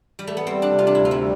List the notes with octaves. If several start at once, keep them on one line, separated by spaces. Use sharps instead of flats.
G3
A3
B3
G3 C4
D4
C3
F4
D4
D2 E4
F4
E4
G3